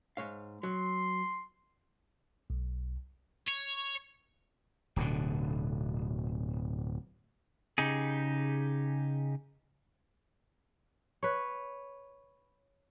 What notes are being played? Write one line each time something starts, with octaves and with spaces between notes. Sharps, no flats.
G#2 C#5 F5
F#3 C6
B1
C#5
D1 B2 D3
C#3 D#4 G4 G#4
B4 C#5